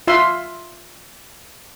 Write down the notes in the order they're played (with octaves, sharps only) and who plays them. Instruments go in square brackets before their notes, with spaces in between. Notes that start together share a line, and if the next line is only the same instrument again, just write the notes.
[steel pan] F4 E5 C6